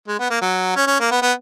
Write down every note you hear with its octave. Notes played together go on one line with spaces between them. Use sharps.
G#3
B3
A#3
F#3
C#4
C#4
A#3
B3
B3